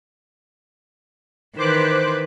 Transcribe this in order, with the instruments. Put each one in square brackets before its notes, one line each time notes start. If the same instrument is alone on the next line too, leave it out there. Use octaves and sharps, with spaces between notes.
[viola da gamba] D#3 E3 B4 [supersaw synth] C5 D6 F#6